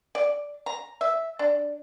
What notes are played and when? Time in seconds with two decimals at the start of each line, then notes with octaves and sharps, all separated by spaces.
0.15 D5
0.66 A#5
1.01 E5
1.39 D4